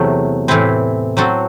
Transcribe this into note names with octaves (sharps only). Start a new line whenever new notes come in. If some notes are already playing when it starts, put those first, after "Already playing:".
Already playing: E2 C3 F#3 A3
A2 E3 C4 E4
F#3 C4 F#4 A4